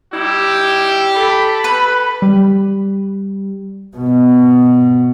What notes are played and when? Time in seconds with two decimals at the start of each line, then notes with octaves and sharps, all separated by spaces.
0.13 G3 D#4 E4 G4
1.16 A4 B5
1.64 B4
2.22 G3
3.97 B2